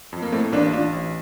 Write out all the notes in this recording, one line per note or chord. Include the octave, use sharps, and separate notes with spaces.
F2
A#3
A2 A3 C4
A1 A#3 D4
A1 D4 F4
A1